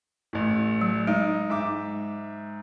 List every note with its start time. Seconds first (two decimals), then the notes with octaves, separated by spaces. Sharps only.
0.33 A1 A2
0.81 F#3
1.07 G#3 D#4
1.50 G#2 E5 D6